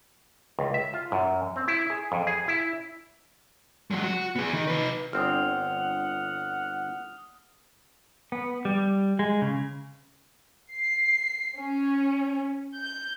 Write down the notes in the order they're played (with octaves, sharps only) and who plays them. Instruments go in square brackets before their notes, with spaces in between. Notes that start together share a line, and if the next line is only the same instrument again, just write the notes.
[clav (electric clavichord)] C#2
E5
F4
F#2
C4
E4
G#4
F2
G#4
E4
[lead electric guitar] F#3 G#3
F#4
B3 G#4
D#3
D#4 B4
[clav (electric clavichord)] G1 C4 D4 [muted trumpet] F#5 [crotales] D#6 F6
[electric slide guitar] B3
G3
G#3
C#3
[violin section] C7
C#4
G6